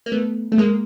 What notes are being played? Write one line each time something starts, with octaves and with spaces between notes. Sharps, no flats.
A#3
A3 B3
A3
G#3 A#3